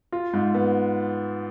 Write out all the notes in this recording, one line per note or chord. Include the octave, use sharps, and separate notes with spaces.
F4
G#2
B3